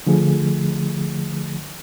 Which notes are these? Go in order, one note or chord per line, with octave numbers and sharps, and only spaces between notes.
D3 F3 A3 G#4